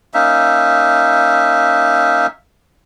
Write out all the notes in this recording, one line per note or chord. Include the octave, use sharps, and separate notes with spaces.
A#3 C#4 D#4 E5